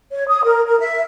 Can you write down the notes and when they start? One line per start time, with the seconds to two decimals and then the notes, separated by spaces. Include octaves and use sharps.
0.12 C#5
0.30 D#6
0.44 A#4
0.68 A#4
0.80 E5